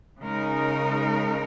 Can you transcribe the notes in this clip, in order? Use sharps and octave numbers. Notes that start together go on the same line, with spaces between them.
C#3 G#3 D#4 A#4